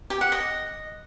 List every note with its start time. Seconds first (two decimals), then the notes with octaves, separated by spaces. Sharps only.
0.10 G4
0.21 F#5
0.32 D#5